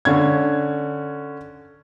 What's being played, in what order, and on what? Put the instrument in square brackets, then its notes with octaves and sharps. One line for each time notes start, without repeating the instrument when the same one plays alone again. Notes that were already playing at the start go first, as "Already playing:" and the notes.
[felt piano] D3 C#4 G#6